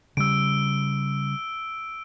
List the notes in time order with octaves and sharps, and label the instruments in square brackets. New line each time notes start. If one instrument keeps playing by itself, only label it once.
[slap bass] C#3 G3 [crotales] E6 D7